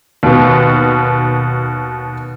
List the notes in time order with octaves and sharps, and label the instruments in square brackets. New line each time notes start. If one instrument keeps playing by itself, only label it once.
[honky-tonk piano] D#2 B2